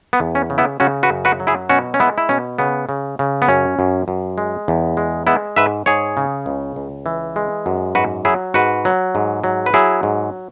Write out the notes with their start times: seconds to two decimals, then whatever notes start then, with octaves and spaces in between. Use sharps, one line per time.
0.13 B3
0.20 E2
0.35 C#4
0.50 C#3
0.58 B3 E4
0.80 C#3 C#4 F#4
1.03 F#4 B4
1.10 F#2
1.25 F#4 B4
1.40 F#3
1.47 E4 G#4
1.69 B2 C#4 F#4
1.94 C#4
2.00 G#3 B3 E4
2.18 E4
2.29 B2 C#4
2.59 C#3 B3
2.89 C#3
3.19 C#3
3.42 B3
3.48 F#2 C#4
3.79 F#2
4.08 F#2
4.38 G#3
4.68 E2
4.97 G#3
5.27 G#3 B3 E4
5.56 G#2 B4 E5
5.86 G#2 G#4 C#5
6.17 C#3
6.46 C#2
6.76 C#2
7.06 E3
7.36 G#3
7.66 F#2
7.95 G#2 F#4 B4
8.25 F#3 E4 G#4
8.54 G#2 F#4 B4
8.85 F#3
9.15 G#2
9.44 F#3
9.66 B4
9.74 F#3 E4 G#4
10.03 G#2